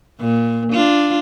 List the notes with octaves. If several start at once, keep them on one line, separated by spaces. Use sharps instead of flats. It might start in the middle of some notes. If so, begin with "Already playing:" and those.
A#2
D4 F4